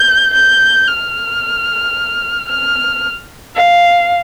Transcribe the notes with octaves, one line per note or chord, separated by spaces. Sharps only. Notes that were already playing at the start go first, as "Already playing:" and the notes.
Already playing: G6
G6
F6
F6
F5